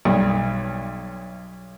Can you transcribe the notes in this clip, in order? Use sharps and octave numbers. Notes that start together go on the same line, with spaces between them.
B1 G2